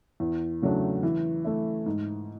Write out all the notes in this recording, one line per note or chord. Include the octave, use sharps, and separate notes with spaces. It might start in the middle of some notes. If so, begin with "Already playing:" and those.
E2
C#3 F#3 A3 D4
E3
A3 E4
G#2